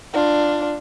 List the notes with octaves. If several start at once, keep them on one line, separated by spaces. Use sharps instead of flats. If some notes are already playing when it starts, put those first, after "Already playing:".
D4 F4